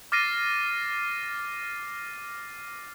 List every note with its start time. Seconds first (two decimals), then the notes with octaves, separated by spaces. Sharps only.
0.12 D6 F6 A6 A#6 C7 D#7